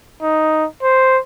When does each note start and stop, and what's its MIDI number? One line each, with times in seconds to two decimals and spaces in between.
0.22 0.66 63
0.83 1.19 72